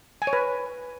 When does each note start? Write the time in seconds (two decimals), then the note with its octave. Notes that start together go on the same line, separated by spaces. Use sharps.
0.22 G#5
0.27 C#5
0.33 B4